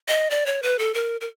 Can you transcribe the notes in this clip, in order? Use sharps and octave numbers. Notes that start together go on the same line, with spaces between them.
D#5
D5
C#5
B4
A4
A#4
A#4